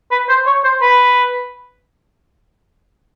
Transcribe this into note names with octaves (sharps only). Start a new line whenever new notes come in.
B4
C5
C#5
C5
B4